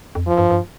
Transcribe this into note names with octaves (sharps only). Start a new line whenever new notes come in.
F2
F3
G2
G2